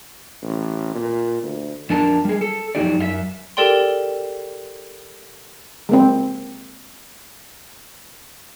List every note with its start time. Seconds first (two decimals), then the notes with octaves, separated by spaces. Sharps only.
0.42 A1
0.95 A#2
1.43 D2
1.90 F2 D4 A#4 A5
2.25 G3 G#4
2.41 A4
2.75 F2 F#3 A#3 D#4 G4 D5
2.98 F#2 F4 E5
3.57 G4 A4 A#4 D5 G5 C6
5.89 G#3 A#3 C4